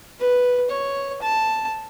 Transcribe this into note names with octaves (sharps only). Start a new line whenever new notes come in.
B4
C#5
A5